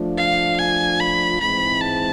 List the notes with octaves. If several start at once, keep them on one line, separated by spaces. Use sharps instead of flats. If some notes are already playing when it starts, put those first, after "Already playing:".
Already playing: F3 A3 D4 F4
F5
G#5
B5
G#2 E3 G#3 C4 E4 B5
A5